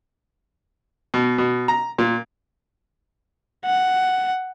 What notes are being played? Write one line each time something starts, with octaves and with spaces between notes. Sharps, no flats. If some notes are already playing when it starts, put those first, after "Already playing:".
B2
B2
A#5
A#2
F#5